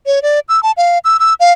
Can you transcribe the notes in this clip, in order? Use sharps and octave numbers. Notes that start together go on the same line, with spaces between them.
C#5
D5
E6
A5
F5
E6
E6
F5